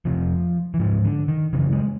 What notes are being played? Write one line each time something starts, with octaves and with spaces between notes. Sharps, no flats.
F2 C3 F3
E3
G#2 F3
D3
D#3
F#2 C#3 E3
G#3